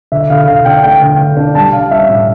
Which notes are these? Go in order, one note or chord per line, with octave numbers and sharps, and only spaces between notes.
D3 E5
D3 F5
D3 F5
D4 G5
A3 G5
D3
D3
D4
G3 A5
G3 F5
C#4 E5
A2